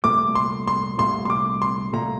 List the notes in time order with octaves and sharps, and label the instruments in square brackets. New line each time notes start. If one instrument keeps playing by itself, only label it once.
[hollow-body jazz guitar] C2 A#2 A3 [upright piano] D6
[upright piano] C6
C6
[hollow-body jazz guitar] C2 A#2 A3 [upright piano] C6
[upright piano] C6
D6
C6
[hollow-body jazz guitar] C2 A#2 A3 [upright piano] A#5